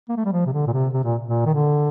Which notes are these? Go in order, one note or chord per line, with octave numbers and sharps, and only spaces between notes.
A#3
A3
G3
F3
C3
D3
A#2
C3
C3
A#2
A#2
D#3
D3